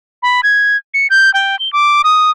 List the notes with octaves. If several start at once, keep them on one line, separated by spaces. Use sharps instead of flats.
B5
G#6
C#7
G6
G5
G7
D6
D#6